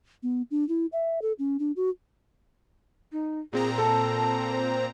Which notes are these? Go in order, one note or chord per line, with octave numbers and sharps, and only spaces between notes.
B3
D4
E4
E5
A4
C#4
D4
F#4
D#4
A#2 C4 G#4 A#5
A4 A5
C5